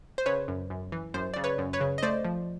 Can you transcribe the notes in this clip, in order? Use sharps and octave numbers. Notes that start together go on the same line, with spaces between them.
C5
C#3 B4 C#5
F#2
F#2
E3
F#2 C5
C#3 D5
B4 C#5
F#2
B4 C#5
C#3
D#5
A3 C5 D5
F3